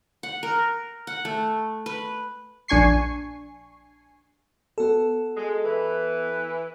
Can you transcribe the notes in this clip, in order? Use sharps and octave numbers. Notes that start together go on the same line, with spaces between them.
F#5
A#4
F#5
A3
B4
A#1 D4 G#5 C#6 C7
B3 F#4 A4
G#3
E3 B4